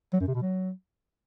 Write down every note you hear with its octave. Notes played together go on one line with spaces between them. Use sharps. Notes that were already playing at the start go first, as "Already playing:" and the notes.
F#3
F#2
C3
B2
F#3